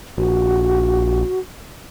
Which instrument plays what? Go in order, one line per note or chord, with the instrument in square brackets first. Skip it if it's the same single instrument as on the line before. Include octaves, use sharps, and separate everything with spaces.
[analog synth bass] A#1 [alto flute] F#4